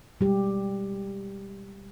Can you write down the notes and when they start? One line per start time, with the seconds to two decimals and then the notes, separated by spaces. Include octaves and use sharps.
0.21 B2 G3 G#3 G4